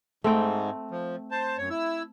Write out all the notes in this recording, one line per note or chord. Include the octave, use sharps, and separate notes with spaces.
G#2 A3 C4 G5
F3
C5 A5
F#2 C#5
E4 E6